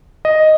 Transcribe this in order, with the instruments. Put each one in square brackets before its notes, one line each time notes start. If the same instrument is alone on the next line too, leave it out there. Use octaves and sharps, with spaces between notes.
[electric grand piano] D#5